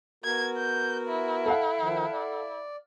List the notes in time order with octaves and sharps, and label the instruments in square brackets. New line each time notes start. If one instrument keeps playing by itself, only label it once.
[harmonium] B3 F#4 A#4 [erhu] G#6
[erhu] G6
E4
[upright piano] A4 F5 F#5
[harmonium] D#3 F3
D5